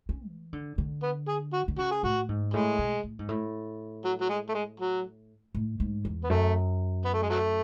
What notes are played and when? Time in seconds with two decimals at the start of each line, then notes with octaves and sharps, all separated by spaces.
0.09 C#4
0.27 E3
0.53 D3
0.78 D3
1.03 B3
1.28 G#4
1.53 F#4
1.68 D3
1.78 C#3 F#4
1.91 G#4
2.03 A2 F#4
2.29 G#2
2.54 A2 G#3
2.79 B2
3.04 A2
3.19 G#2
3.29 A2
4.05 F#3
4.21 F#3
4.29 G#3
4.49 A3
4.55 G#3
4.80 F#3
5.55 A2
5.80 G#2
6.05 E2
6.24 B3
6.30 F#2 A3
7.05 B3
7.14 A3
7.22 G#3
7.30 F#3 A3